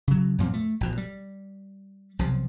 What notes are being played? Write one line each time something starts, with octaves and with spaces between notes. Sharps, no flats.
C#3 F#3
F#2 A#2 F3 C4
A3
A#1 B2 F3
G3
B1 C3 F3